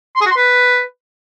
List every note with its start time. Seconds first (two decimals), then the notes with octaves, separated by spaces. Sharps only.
0.16 C6
0.21 G#4
0.26 F#4
0.31 C6
0.36 B4